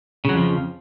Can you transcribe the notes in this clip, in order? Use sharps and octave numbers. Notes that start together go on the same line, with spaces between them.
F2 C#3 F3 F#3